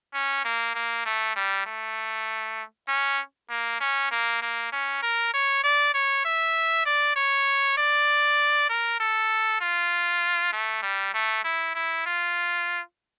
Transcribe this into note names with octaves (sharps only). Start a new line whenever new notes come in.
C#4
A#3
A#3
A3
G3
A3
C#4
A#3
C#4
A#3
A#3
C#4
A#4
C#5
D5
C#5
E5
D5
C#5
D5
A#4
A4
F4
A3
G3
A3
E4
E4
F4